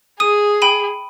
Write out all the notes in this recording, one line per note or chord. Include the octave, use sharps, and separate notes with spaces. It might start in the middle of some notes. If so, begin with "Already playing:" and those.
G#4 D#6 D#7
G5 B5 D#7